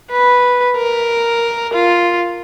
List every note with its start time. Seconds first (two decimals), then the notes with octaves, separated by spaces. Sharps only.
0.11 B4
0.77 A#4
1.73 F4